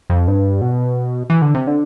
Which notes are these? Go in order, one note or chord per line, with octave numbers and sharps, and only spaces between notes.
F2
G2
B2
E3
D3
C3
D3